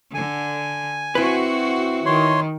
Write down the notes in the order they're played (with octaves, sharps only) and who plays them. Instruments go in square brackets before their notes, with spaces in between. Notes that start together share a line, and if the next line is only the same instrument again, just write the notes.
[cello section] D3 [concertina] G#5
[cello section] C4 F#4 [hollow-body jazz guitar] E4 B4
[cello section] D#3 [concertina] C#5 C6